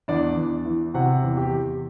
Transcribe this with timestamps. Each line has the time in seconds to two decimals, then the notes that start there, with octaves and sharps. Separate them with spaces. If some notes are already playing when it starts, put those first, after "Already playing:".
0.08 E2 D4 D5
0.37 E2
0.65 E3
0.94 C3 F#4 F#5
1.23 E2
1.37 G4 G5
1.52 E2